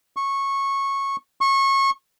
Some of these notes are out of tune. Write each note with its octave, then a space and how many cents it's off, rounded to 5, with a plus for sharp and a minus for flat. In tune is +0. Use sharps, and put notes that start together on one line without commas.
C#6 -15
C#6 -25